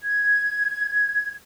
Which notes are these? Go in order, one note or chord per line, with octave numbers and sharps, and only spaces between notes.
G#6